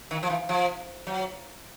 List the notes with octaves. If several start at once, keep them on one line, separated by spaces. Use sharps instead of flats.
D#3
F3
E3
F3
F#3